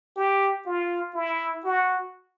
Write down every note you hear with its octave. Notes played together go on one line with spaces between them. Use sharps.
G4
F4
E4
F#4